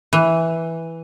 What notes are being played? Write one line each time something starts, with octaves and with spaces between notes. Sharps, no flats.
E3